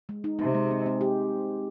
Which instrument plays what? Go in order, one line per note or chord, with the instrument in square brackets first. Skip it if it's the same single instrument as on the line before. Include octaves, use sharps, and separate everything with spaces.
[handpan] G#3
D#4
[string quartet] C3 [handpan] D#4
[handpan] G#3
C4
C4
G4